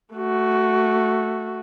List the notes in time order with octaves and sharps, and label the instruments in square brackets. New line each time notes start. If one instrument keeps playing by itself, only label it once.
[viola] A3 F#4